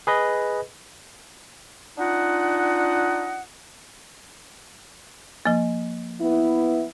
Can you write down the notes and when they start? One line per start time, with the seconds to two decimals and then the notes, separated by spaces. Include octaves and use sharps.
0.07 G#4 B4 D#5
1.98 D4 D#4 F4 D#5 F#5
5.46 F3 A#3
6.21 B3 E4